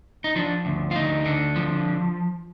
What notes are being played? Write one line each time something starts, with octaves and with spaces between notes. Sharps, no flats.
D#4
F3 D4
D2
F4
D2 D#4
D3
F3